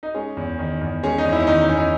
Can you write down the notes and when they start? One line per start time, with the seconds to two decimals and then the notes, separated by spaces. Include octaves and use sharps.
0.03 D#4
0.14 G#3 C#4
0.37 E2
0.59 D#3
0.81 E2
1.03 G#3 C#4
1.18 D#4
1.25 E2
1.33 E4
1.40 C#4
1.47 D#3 D#4
1.61 D#4
1.69 E2 C#4
1.77 D#4